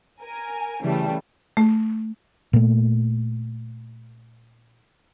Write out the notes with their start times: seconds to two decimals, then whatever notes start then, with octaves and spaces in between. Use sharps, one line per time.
0.21 A#4 G#5
0.82 C#3 E3 G3 A3
1.57 A3
2.53 A#2 A3